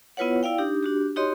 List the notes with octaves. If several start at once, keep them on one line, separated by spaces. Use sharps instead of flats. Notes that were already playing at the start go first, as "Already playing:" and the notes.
B3 E4 F4 B4 C#5 F#5
E4 D5 F5 G5
D4 D#4 G4
D4 F#4 G4
D#4 F#4 G4 C#5 D#5 C6